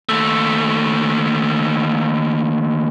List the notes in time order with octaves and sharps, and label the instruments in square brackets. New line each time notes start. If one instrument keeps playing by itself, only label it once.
[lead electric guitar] D#2 A3